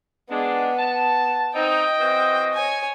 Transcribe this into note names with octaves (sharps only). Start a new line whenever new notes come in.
G#3 B3 D4
A5
C4 D#4 D#5 G5
E3 C4 F#4
C#5 G#5